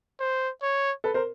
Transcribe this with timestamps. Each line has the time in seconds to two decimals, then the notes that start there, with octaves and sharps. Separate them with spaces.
0.20 C5
0.62 C#5
1.04 A4 B4
1.14 A#4 C5